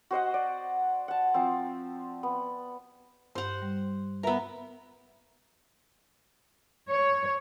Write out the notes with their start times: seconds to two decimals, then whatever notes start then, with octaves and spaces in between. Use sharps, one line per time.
0.11 F#4 C5 D#5 F#5
0.34 D5
1.08 F#5 A5
1.34 F3 C4
2.23 B3
3.35 G2 C5 F#5
3.62 G3
4.23 B3 A#4 B4 E5 A#5
6.90 C#5